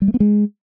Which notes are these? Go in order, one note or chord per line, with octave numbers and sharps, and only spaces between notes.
G3
A3
B3
G#3